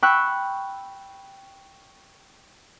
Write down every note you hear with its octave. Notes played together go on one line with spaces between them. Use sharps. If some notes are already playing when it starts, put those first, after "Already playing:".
G5 B5 C#6 E6 F#6